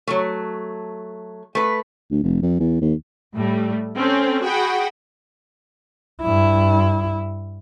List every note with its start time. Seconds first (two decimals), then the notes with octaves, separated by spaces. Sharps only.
0.07 F#3 A3
1.55 A3 B4
2.11 D2
2.23 F1
2.42 F2
2.60 E2
2.81 D#2
3.35 A2 G3 A3
3.96 C4 C#4 A4
4.43 F#4 G#4 F#5 G5 B5
6.22 G2 E4